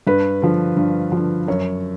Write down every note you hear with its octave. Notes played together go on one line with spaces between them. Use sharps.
G2 B4
D3 F3
G2
D3 F3
F#2 C#5